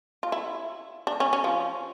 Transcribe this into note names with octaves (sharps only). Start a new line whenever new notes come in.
F4
E4
D4
C#4
C#4
F3